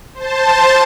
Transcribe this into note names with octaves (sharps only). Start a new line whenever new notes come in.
C5 A5